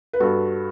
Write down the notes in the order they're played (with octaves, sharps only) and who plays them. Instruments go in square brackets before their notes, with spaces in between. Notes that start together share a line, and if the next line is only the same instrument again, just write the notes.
[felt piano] B4
G2 F#4 A4